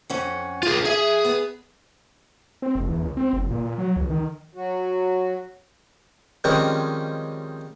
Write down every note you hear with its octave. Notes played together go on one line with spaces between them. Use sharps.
F2 C#4 F#5
F4 G#4 F5
G#4 E5
B3
C4
F1
E2
C#2
C4
F#1
A#2
A#2
F#3
C#2
D#3
F#3 F#4
D#3 F3 G3 G#3 C4 C#4